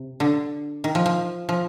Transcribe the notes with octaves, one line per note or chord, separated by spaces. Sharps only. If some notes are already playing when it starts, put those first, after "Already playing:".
Already playing: C3
D3
D#3
F3
F3
F3